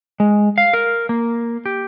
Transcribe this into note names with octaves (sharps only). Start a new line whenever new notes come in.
G#3
F5
A#4
A#3
G4